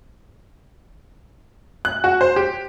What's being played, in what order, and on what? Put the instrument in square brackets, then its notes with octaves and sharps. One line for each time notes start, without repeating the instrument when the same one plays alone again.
[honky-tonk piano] F#6
F#4
C5
G4